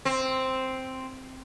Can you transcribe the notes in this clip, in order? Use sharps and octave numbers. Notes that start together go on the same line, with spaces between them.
C4